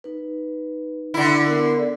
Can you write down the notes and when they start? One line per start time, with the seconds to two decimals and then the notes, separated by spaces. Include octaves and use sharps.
0.04 D#4 B4
1.14 D3 E4
1.46 B3 D4 A#4
1.78 A4 D5